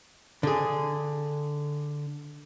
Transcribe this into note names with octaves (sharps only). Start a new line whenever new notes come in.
D3 G#4